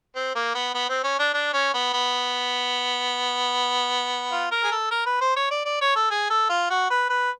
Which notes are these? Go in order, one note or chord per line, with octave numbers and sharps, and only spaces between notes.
C4
A#3
B3
B3
C4
C#4
D4
D4
C#4
B3
B3
F4
A#4
G#4
A4
A#4
B4
C5
C#5
D5
D5
C#5
A4
G#4
A4
F4
F#4
B4
B4